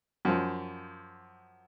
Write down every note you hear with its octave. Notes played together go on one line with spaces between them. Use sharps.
F#2 F3